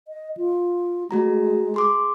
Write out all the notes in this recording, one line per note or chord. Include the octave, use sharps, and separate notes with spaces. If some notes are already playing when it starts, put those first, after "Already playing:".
D#5
F4
G#3 A3 F#4 A#5
G#4 C6 D6